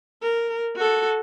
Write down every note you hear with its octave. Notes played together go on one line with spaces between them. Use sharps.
A#4
F#4 A4